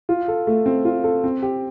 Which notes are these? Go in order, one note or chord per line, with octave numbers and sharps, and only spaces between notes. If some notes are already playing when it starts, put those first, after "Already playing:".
F4
A4
A3
C4
F4
A4
C4
G4